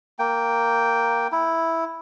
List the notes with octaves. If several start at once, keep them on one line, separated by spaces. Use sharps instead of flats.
A#3 G5
E4